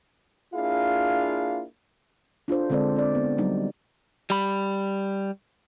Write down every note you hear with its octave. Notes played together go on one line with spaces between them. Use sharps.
A#3 D4 E4 F4 G#4 F5
D4 F4 A4 C5
D3 G#3 C4 A4 C5 D5
C4 D5
B3
F#3 G3 D#4
G3 B5